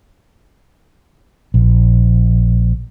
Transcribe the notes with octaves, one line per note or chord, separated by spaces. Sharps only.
A#1